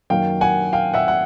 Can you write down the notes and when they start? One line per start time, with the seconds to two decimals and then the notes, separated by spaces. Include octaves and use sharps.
0.10 F#2 D#3 F#3 A#3 F5 G5
0.41 F#5 G#5
0.73 F5 G5
0.94 E5 F#5
1.08 F#5